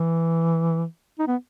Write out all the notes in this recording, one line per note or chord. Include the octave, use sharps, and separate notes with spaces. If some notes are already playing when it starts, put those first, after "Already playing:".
Already playing: E3
D#4
B3